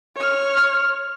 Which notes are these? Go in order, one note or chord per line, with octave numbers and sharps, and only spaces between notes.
C#5 F6